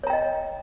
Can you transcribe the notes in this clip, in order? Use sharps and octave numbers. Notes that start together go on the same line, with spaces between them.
C#5 D#5 G5 A#5